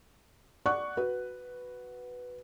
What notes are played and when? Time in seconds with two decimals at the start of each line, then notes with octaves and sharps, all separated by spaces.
0.66 D5 F#5 C#6 F#6
0.97 F#4 B4